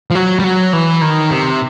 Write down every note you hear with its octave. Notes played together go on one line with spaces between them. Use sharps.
F3
F#3
G3
F#3
E3
D#3
C3